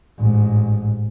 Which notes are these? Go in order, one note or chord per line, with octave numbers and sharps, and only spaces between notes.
A1 G#2